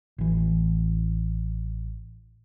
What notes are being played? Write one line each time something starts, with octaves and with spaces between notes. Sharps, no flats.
A1 E3